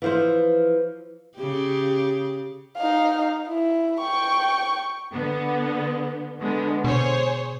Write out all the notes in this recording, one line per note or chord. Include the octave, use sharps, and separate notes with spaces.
E3 F3 C5
C#3 G4
D#4 F5
E4
G5 C#6
D3 B3
D3 G#3 B3
B2 G#4 C5 C#5